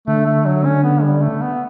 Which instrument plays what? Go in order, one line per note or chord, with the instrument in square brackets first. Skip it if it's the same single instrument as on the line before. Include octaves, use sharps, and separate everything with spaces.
[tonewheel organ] D3 [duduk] A3
[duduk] A3
F#3
C#4
B3
G3
A3
B3